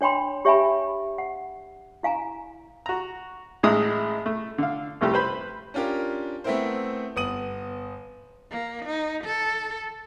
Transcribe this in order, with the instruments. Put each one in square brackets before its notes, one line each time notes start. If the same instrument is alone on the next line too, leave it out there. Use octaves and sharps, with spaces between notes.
[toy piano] D4 C#5 G5 B5 C6
G4 C#5 E5 G5 G#5 B5
F#5
E4 F5 G#5 A#5
[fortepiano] F#4 A#5
A1 A2 G#3 D#4 A#5 D#6
A3
D3 F5
C2 F2 G3 A3 G4
B4 C5 B5
[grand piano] C#4 D4 F4 G4 A#4
A3 B3 C4 E4 A#4 C5
G1 B3 D#6 D#7 F#7
[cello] A#3
D#4
A4